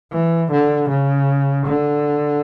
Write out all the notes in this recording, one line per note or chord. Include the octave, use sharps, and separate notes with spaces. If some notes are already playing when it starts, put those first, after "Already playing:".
E3
D3
C#3
D3